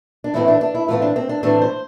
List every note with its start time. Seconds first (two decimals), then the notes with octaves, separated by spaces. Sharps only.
0.24 D4
0.34 A2 E3 A3 C4 E4
0.48 D4
0.61 D4
0.75 E4
0.88 A2 E3 A3 C4 F4
1.02 D4
1.16 C4
1.29 D4
1.43 A2 E3 A3 C4 D4
1.62 C5